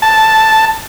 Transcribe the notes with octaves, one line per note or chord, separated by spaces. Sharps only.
A5